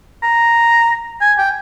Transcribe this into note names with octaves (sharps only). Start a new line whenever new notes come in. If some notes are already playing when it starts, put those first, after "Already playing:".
A#5
G#5
G5